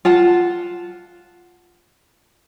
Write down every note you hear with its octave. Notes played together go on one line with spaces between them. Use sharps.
F4 F#5 A5